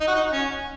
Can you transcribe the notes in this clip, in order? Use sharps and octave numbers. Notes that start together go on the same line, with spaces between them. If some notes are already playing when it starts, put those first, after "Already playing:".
D#4
F#4
D#4
C#4